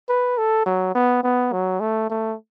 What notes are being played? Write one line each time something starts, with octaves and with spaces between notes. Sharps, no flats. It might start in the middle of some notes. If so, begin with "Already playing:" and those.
B4
A4
F#3
B3
B3
F#3
A3
A3